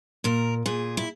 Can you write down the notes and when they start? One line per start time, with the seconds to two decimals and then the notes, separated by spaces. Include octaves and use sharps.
0.24 A#2 A#4
0.66 A#2 G#4
0.97 E4